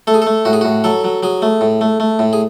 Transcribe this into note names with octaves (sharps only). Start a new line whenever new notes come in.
A3 A4
G#4
A3 A4
A2 F#4
G#4
A2 F#4
F#3 A4
F#3
F#3 G#4
A3
A2
A3
A3
A2
G#4